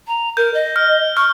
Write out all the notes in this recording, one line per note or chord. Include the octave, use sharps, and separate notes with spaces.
A#5
A#4 G6
D#5
F6
C#6 F6